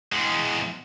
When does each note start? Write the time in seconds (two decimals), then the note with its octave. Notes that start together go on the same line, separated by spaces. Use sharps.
0.13 E2 G#3